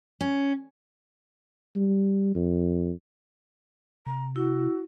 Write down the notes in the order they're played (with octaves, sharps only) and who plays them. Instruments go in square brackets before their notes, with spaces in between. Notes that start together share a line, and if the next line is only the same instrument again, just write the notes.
[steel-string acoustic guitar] C#4
[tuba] G3
F2
[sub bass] C3 [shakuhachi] A#5
[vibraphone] E4 [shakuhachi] F#4